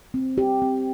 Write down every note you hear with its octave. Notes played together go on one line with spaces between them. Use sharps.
C4
G4
C4